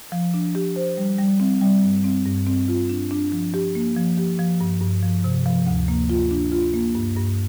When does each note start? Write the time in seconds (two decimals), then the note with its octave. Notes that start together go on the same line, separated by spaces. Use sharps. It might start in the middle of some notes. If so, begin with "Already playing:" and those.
0.12 F3
0.34 D4
0.55 G4
0.76 C5
0.97 G3
1.18 G3
1.40 C4
1.61 G3
1.83 G2
2.04 C4
2.25 G2
2.47 C4
2.68 F4
2.89 D4
3.11 D4
3.32 F3
3.54 G4
3.75 A#3
3.97 F3
4.18 G4
4.39 F3
4.60 G2
4.81 G2
5.03 F3
5.24 C3
5.46 F3
5.67 D2
5.88 A#3
6.10 F4
6.31 D4
6.52 F4
6.74 A#3
6.95 G2
7.16 G2